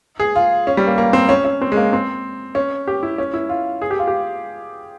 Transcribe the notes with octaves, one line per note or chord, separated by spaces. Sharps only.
G#4
F4
C#4
G3
A#3
A#3
C4
C#4
C#4
C4
G#3
A#3
C4
C#4
G4
E4
C#4
E4
F4
G#4
G4
F4
G4